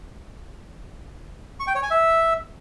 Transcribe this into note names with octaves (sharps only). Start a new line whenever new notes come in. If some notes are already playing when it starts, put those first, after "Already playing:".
C#6
G5
C#5
G#5
E5